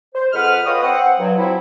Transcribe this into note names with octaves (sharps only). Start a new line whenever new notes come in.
C5
F2 G#3 B4 F#5 F6
F4 B4 C#5 D#5 G5 D#6
C4 F#5
G2 F#3
F3 F#3 C4 E4